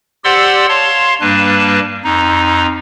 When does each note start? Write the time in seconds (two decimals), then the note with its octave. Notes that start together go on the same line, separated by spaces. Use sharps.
0.24 G4 C5 D5 F#5 C6 E6
0.69 C#5 F5 A5 C6
1.21 G2 G3 A#3 D4 B4 A5
2.04 F2 D#4